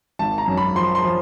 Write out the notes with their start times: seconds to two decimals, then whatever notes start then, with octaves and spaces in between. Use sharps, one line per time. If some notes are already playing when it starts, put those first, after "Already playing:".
0.19 G#1 A5
0.38 A#5
0.48 F#2
0.57 B5
0.75 F3 C6
0.95 C6
1.04 F3